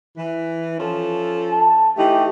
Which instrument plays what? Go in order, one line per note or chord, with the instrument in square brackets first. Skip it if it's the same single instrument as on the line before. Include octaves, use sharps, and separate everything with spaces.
[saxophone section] E3
F3 C#4 A4
[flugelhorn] A5
[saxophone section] E3 A3 D#4 [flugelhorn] G4